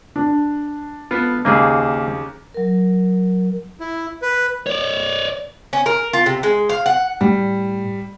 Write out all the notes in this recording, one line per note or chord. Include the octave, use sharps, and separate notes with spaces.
D4
B3 F4 A4
D#2 C#3 A#3 C4 G#4
F#3 A#4
E4
B4
C#5 D5
C#4
A#4
F4
C3
G#3
F5
F#5
A2 G3